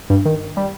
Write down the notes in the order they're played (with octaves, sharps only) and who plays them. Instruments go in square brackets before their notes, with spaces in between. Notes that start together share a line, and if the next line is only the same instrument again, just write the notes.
[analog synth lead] G2
D#3
G3